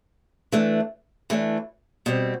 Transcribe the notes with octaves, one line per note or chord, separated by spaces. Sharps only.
E3 A3 D4
E3 A3 D4
B2 G3 C4